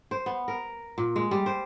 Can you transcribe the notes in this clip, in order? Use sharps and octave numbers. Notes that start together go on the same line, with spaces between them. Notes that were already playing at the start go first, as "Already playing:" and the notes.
C5
B3
A#4
A#2
G#3
G3
C5